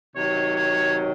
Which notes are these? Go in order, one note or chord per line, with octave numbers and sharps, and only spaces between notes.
C3 D#3 F#3 C#5
C#5